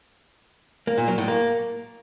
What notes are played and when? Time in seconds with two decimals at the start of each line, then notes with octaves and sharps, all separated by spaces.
0.87 A#3
0.98 A#2
1.08 F#3
1.18 A2
1.28 A#3